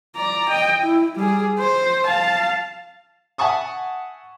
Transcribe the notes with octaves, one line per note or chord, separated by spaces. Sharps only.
D5 A#5
D#5 G5
E4
G3 G#4
C5
F5 A5
E5 F#5 G#5 A5 C#6 D#6